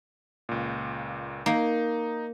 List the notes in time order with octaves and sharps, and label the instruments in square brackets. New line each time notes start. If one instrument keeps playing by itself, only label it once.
[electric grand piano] C#2 A#2
[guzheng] A#3 [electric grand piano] D#4